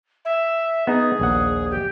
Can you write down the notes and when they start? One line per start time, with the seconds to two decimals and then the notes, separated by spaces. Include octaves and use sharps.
0.25 E5
0.87 B3 D#4 G#4
1.20 A#1 D#2 F#5
1.71 G4